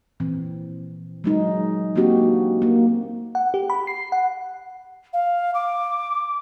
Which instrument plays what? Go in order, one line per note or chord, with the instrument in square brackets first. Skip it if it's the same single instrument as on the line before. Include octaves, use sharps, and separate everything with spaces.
[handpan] A#2 E3 C4
F#3 G#3 D#4
A#3 C4 D4 F#4 G4
A#3
[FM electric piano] F#5
G4
B5
C7
F#5
[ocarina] F5
D6